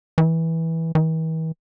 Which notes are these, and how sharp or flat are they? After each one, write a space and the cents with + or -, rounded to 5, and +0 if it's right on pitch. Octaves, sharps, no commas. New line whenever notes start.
E3 -15
E3 -45